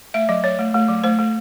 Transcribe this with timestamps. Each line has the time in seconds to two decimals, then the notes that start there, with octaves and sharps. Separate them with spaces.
0.14 A3 E5
0.29 F#3 D#5
0.44 F#3 C#5
0.59 A3
0.74 A3
0.89 F#3
1.04 A3 C5
1.19 A3